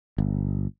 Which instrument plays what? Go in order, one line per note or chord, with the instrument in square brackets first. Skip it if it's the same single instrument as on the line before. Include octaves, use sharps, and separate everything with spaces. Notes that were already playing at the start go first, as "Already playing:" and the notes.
[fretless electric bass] G1